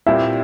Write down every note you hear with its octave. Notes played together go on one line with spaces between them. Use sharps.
A#2 G3 C4 E4 E5